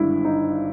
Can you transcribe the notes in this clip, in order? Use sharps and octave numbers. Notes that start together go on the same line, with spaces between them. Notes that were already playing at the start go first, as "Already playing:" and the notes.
Already playing: G#1 G2 D3 E4
D#4